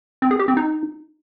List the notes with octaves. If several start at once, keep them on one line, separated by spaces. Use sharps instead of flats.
C4
G#4
G4
C4
D#4